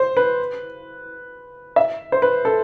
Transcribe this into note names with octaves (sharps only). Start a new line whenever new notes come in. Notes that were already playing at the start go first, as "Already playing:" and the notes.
Already playing: C5
B4
E5
C5
B4
A4